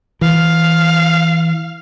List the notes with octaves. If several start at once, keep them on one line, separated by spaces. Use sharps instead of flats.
E3 F5